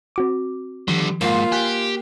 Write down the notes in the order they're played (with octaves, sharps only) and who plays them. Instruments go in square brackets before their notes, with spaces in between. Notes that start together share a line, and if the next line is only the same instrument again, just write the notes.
[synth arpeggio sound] C4 F#4 D6
[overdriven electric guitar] D3 G3 [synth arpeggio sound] D#3 F3
[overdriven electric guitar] G#2 [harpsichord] A#3 B4 C5 [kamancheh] F4
[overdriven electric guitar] G4 [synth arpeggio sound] G#5 F#6 B6